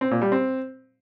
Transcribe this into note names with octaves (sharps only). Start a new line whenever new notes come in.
C4
A#2
G3
C4